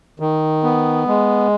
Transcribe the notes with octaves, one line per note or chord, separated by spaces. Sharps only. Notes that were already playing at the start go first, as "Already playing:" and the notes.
D#3
B3
G#3